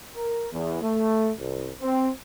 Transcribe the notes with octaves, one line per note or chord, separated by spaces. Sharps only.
A#4
E2
A3
C2
C4